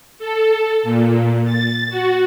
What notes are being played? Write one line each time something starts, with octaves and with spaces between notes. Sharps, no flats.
A4
A#2
A6
F#4